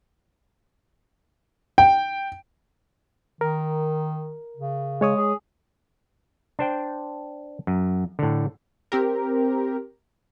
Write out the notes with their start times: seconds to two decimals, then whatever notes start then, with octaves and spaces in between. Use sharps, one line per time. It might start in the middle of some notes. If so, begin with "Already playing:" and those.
1.78 G5
3.41 D#3 A#4
4.57 C#3
5.01 G#3 C#5 D#6
5.16 G#4
6.59 D4 C5 G5
7.67 F#2
8.19 A2 D3
8.92 C4 G4 A#4